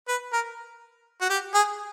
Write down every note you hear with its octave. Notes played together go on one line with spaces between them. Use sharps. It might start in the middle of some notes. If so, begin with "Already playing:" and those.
B4
A#4
F#4
G4
G#4